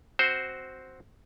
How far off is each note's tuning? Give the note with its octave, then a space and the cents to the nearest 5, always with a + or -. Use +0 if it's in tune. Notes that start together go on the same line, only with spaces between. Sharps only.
C4 +0 F#4 +5 C5 +0